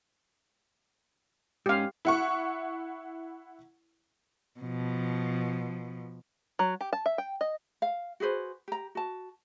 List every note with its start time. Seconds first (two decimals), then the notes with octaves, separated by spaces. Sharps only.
1.66 G#2 C#4 G4 F5
2.05 E4 F#5 C#6
4.60 B2 F3
6.59 F#3
6.81 G4
6.93 A5
7.06 E5
7.18 G5
7.41 D#5
7.82 F5
8.20 F#4 G#4 B4 C5
8.68 G4 A#5
8.95 F#4 A5